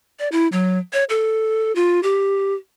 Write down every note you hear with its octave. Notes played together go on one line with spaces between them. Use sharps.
D5
E4
F#3
C#5
A4
F4
G4